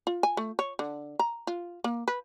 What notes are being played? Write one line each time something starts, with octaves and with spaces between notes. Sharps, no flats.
F4
G#5
A3
C#5
D3
A#5
F4
A#3
B4